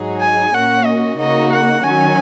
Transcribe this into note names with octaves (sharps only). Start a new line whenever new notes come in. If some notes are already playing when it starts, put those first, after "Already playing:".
Already playing: G#2 F#3 D#4 G#4
G#5
A#2 A#3 C#4 F#4 F#5
D#5
C#3 A#3 D#4 F#4 D#5
F#5
D#3 F#3 C#4 G#5